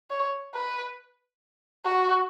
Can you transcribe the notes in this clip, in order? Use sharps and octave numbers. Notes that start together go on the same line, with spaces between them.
C#5
B4
F#4